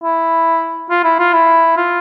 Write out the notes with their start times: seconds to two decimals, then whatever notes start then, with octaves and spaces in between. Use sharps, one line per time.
0.04 E4
0.90 F4
1.04 E4
1.19 F4
1.33 E4
1.77 F4